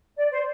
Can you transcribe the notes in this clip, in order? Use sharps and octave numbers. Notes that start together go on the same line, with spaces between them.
D5
C5